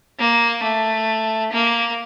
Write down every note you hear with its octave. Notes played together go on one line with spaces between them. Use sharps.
A#3
A3
A#3